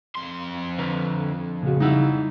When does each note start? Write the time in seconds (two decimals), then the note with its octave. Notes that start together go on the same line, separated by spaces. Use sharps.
0.15 F2 C6
0.78 D3 B4 A#5
1.62 A#2 C#3 F#4
1.80 G3 D#4 E4 F#5